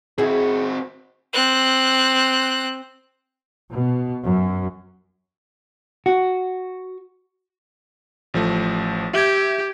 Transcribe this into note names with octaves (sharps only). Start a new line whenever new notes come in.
C4 E4 F#4 G#4
C4 F#6
B2
F#2
F#4
A1 F3 A3
G4 E5 G6 G#6